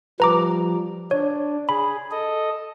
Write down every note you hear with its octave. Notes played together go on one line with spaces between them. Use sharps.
F3 G3 B4 A#5 D6
D4 C#5
G#4 B5
A4 D#5